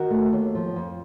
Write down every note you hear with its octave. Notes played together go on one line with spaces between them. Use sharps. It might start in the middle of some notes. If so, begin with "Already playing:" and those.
Already playing: D#3 F#4 A#4
A3
D#2
F3
F2